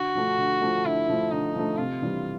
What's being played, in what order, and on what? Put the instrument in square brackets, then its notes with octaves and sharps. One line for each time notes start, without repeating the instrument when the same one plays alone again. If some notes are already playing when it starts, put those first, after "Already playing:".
Already playing: [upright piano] D3 [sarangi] F#4
[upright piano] F3 A3
D3
F3 A3
[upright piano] D3 [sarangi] E4
[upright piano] F3 A3
[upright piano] D3 [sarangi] D#4
[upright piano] F3 A3
[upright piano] C3 [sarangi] F4
[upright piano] E3 G3